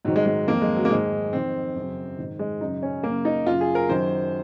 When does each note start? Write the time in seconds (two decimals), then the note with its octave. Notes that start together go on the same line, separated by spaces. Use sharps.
0.05 G#2 F#3
0.08 D#3
0.16 G#3
0.26 G#3
0.47 F2 D#3 A#3
0.62 G#3
0.76 F#3
0.85 A#3
0.90 G#2 D#3 G#3
1.33 F2 D#3 C4
1.76 F#2 C#3
2.19 G#2 D#3
2.39 G#3
2.61 F#2 C#3 D#4
2.83 C#4
3.03 F#2 C#3 A#3
3.25 D#4
3.46 F#2 C#3 F4
3.61 G#4
3.75 A#4
3.89 F#2 D#3 C5